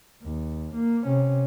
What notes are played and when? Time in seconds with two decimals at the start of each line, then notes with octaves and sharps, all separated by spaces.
0.23 D#2
0.74 A#3
1.05 C3 C#4